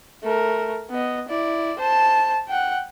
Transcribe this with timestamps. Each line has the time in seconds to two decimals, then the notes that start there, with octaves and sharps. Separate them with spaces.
0.24 A3 A#4
0.91 B3 D#5
1.29 E4 D5
1.79 C5 A5
2.48 F#5 G5